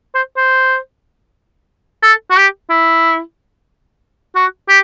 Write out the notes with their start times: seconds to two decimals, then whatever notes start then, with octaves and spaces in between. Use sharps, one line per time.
0.15 C5
0.37 C5
2.03 A4
2.30 F#4
2.37 G4
2.70 E4
4.35 F#4
4.68 G4